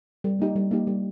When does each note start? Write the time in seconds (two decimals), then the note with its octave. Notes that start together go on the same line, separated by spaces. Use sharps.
0.24 G3
0.39 A#3 D#4 G4
0.56 G3
0.71 A#3 D#4 G4
0.87 G3